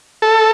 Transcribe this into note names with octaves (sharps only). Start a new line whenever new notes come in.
A4